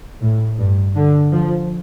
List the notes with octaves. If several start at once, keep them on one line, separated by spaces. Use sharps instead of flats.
A2
G2
D3
F3